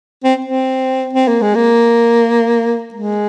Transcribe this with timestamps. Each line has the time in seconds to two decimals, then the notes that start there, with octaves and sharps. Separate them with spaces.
0.24 C4
0.45 C4
1.13 C4
1.28 A#3
1.42 G#3
1.55 A#3
2.94 G#3